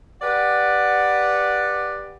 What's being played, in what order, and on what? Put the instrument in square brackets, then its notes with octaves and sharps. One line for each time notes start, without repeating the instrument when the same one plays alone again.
[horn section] G4 B4 D5 F#5